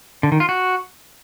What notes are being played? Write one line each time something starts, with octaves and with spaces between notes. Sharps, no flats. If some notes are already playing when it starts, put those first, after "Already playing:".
D3
D#3
F4
F#4